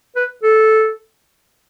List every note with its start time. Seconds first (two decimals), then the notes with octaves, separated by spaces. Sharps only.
0.16 B4
0.43 A4